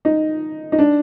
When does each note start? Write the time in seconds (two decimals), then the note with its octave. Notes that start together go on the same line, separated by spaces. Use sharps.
0.05 D#4
0.72 D#4
0.79 D4